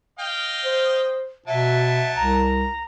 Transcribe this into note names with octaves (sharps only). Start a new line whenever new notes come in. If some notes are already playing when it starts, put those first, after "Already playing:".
D#5 F5 G5
C5
B2 F#3 E5 A5
C2 A#5